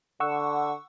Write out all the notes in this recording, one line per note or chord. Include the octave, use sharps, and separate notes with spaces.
D3 F#5 C#6 E6